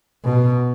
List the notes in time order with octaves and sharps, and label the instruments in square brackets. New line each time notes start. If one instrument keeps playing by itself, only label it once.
[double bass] B2